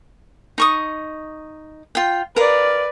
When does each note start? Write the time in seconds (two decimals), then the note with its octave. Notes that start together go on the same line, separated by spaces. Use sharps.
0.58 D#4 C#6 D#6
1.95 F4 G5
2.36 A#4 B4 D5 F5